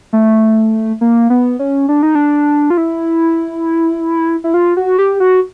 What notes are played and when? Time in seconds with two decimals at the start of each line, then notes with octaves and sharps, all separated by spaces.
0.13 A3
1.01 A#3
1.30 B3
1.59 C#4
1.89 D4
2.03 D#4
2.15 D4
2.70 F4
2.77 E4
4.44 E4
4.54 F4
4.77 F#4
4.99 G4
5.20 F#4